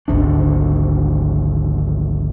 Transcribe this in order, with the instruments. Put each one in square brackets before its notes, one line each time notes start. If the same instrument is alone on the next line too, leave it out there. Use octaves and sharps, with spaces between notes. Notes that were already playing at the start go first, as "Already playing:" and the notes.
[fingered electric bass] G#1 D2 D4